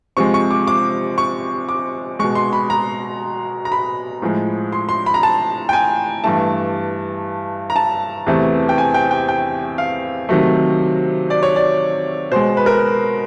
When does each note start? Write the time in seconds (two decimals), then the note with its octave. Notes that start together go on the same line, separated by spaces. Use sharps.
0.17 C3 F3 G#3 C#6
0.34 C#6
0.51 D6
0.67 D6
1.18 C#6
1.69 D6
2.19 B2 G#3 C#6
2.35 C6
2.53 B5
2.70 A#5
3.65 A#5
3.72 B5
4.22 A2 F3 G#3
4.73 C6
4.89 C6
5.06 B5
5.14 A#5
5.23 A5
5.69 G5
5.73 G#5
6.24 G2 E3 A3 A5
7.70 A#5
7.76 A5
8.26 E2 C3 E3 A3
8.69 G5
8.78 G#5
8.94 G5
9.11 G5
9.28 G5
9.78 F5
10.29 C3 D#3 F#3 A3
11.30 D5
11.43 C#5
11.56 D5
12.32 B2 G#3 C5
12.57 B4
12.66 A#4